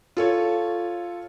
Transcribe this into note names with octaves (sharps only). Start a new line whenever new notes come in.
F4 A4 C#5